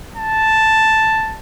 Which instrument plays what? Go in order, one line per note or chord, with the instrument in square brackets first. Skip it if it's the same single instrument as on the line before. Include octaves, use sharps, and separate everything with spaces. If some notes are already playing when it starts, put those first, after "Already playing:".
[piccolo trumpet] A5